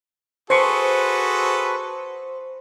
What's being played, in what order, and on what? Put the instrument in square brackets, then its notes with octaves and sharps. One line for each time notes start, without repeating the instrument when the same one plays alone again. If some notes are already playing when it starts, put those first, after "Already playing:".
[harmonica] F#4 G#4 A4 [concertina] B4 [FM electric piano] C5 [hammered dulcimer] C6 C#6